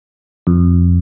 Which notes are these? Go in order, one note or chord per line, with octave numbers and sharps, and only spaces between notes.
F2